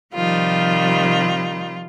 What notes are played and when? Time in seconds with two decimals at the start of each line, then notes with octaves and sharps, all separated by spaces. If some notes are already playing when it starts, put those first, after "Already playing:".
0.14 C3 D#3 F3 G3 F4